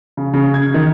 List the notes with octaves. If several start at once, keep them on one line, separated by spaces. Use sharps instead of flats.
C#3
C#3
G#6
D#3